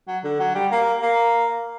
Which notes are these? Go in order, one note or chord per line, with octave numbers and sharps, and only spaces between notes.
F#3
D3
F#3
G3
A#3
A#3